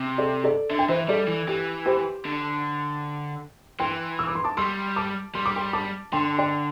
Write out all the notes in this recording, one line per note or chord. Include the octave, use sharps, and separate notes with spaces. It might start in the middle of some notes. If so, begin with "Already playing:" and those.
Already playing: C3
A4 D5
A4 D5
D3 E5
G5
E3 C5 E5
G3 A4 D5
E3
E3 G4
G4 C5
D3
E3 G5 C6
E6
D6
C6
A5 D6
G3 C6 E6
A5 D6
G3 C6
D6
G5 C6
A5 D6
D3 G5 C6
D5 G5